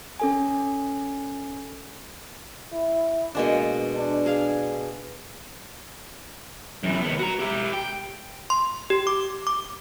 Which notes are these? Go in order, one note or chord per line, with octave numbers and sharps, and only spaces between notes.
C#4 A4 G#5
E4
B2 G#3 A#3 D4
D4
G#4 F5
F#2 E3
D#2 B3
F#4 A#5
E4 G4
G5
C6
G4
D6
D6